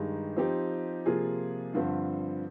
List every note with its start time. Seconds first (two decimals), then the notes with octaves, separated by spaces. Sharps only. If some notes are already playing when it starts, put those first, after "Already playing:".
Already playing: G2 D#3 G#3 D#4 G4
0.36 F3 C4 D#4 G4
1.06 C3 F3 A#3 F4 G#4
1.74 G2 D3 F3 C4